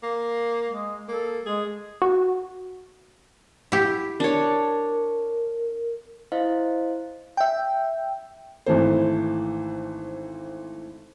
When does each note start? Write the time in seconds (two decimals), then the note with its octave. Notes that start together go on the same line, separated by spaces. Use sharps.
0.03 A#3
0.69 G#3
1.09 A#3 A4
1.46 G#3 G#4
2.02 F#4
3.72 E4 G4
4.20 D4 A#4 C#5
6.32 E4 C5 D#5 F5
7.37 E5 G5
8.66 G#1 E3 A3 C5